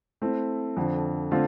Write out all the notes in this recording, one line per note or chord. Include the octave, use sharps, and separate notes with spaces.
A3 C4 E4
F2 D3 F3
D3 A3 C4 F4